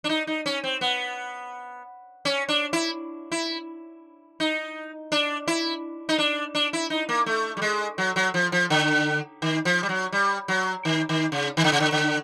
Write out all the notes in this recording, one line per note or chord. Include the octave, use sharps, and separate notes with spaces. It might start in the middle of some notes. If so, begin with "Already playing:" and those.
D4
D#4
D#4
C#4
C4
B3
C#4
D4
E4
E4
D#4
D4
E4
D#4
D4
D4
E4
D#4
A#3
A3
G3
G#3
F#3
F#3
F3
F3
D3
D#3
F3
G3
F#3
G3
F#3
D#3
D#3
C#3
D#3
D3
C#3
D3
D3